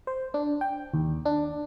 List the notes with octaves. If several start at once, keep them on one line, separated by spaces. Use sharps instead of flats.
C5
D4
G5
D#2
D4